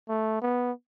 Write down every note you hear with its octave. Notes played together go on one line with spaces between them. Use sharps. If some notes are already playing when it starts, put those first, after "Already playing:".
A3
B3